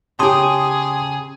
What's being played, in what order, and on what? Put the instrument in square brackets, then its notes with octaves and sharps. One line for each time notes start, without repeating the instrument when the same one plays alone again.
[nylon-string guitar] C#3 G4 [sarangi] G#4 [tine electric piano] A5 C6 D#6